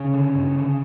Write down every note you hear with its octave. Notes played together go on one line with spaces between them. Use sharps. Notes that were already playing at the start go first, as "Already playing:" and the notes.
Already playing: C#3 C#4
D3
G2
D3